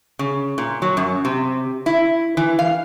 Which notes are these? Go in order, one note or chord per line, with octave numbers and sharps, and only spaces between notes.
C#3
A#2
F#3
F#2
C3
E4
E3
F5